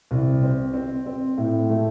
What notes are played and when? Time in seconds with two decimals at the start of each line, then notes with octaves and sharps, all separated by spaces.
0.11 C2
0.43 C4
0.74 C4
1.06 C4
1.38 A2
1.69 A3